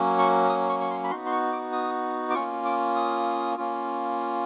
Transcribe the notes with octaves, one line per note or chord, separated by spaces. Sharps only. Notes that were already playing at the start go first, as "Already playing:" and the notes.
Already playing: F#3 A#3 C#4
C#6
D#6
C#6
C#6
C6
B5
B3 D#4 F#4 C6
C6
C#6
D6
D#6
D6
A#3 C#4 F4 C#6
D6
D#6
A#3 C#4 F4